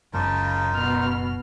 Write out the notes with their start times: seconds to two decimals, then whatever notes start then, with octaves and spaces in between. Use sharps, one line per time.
0.14 F#1 C#2 F#2 C#3 D#4 F4 A#4 A5
0.75 B2 F6